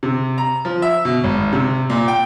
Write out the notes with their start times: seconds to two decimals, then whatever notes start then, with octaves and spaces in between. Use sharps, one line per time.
0.03 C3
0.38 A#5
0.65 F3
0.82 E5
1.05 B2
1.24 G#1
1.53 C3
1.90 A#2
2.08 G5